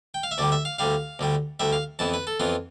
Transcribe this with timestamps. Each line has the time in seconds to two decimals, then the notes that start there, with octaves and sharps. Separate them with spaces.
0.14 G5
0.23 F5
0.31 E5
0.38 D2 D3 G3 D5
0.52 E5
0.65 F5
0.78 D2 D3 G3 F5
1.19 D2 D3 G3
1.60 D2 D3 G3 E5
1.73 F5
1.99 F2 E3 B3 A5
2.14 B4
2.27 A4
2.40 F2 E3 B3 F4